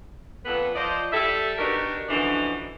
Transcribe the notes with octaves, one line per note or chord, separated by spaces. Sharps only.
F2 A#2 B3 A4 B4
F3 C5 D5 D#5
G3 A4 E5
B3 D4 D#4 F#4 G4 A#4
F#2 B2 D3 E3 F3 D4